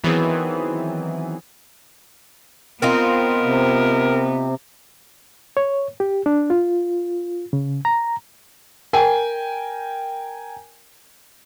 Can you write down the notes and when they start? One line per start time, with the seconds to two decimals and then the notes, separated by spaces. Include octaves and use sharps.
0.03 D#3 E3 F#3 B3 C4 G#4
2.82 B3 C4 D#4 F4 A#4
3.43 C3
5.57 C#5
6.00 G4
6.26 D4
6.50 F4
7.53 C#3
7.85 A#5
8.93 A#4 G5 G#5